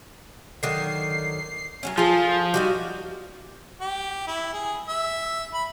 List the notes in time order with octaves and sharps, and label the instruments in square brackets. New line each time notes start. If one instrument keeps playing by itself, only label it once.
[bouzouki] D3 D#3 F#3 [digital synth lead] C7
[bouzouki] F#3 G3 C#4
[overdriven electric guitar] F3 [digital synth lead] F4 [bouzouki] G#4 A4
[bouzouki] G3 D#4 F5 [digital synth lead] F#4
[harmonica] G4
E4
G#4
E5
B5